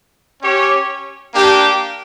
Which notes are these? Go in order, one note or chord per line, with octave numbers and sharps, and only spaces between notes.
C#4 G4 C#5
A#3 D4 G4